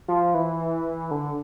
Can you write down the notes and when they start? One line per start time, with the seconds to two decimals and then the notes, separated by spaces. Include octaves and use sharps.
0.08 F3
0.34 E3
1.11 D3